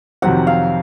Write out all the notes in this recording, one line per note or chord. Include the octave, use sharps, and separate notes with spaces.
F2 C3 D#3 F#3 C4 F#5
F5